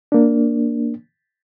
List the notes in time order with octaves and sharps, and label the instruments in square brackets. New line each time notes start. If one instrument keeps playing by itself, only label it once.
[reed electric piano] A#3 D4